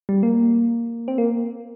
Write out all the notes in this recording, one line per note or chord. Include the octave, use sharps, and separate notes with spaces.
G3
A#3
C4
A#3